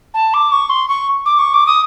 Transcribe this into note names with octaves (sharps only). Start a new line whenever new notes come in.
A5
D6
C#6
C6
C#6
D6
C#6
D6
D#6